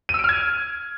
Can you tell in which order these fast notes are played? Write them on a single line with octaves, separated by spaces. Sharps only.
D#7 E6 D7 F6 G#6